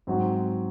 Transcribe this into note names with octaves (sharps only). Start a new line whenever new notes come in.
G#2 F#3 C4 F#4